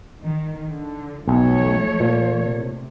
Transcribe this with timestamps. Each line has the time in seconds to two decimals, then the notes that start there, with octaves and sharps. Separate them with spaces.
0.22 D#3
0.70 D3
1.28 B1 F3 A3 C#5
2.00 A#2
2.46 C3